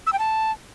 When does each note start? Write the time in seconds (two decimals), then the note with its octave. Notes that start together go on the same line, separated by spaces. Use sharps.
0.07 E6
0.13 G5
0.19 A5